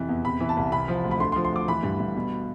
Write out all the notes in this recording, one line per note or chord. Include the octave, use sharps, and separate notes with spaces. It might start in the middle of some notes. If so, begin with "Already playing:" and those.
Already playing: F2 C3 E3
E2
C3 B5
E3
A5
C2
C3 B5
F3
D2
B5
D3 C6
C6
F3
C6
D2 D6
E3 B5
G2
G2
B2